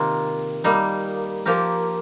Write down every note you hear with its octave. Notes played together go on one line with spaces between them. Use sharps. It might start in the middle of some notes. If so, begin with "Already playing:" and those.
Already playing: C3 D#3 A#3 F4
G3 A#3 D#4
F3 A#3 G4 A#4